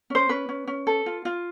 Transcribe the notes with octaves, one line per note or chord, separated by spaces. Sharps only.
C#4 C5
C#4 B4
C#4
C#4
A4
F4
F4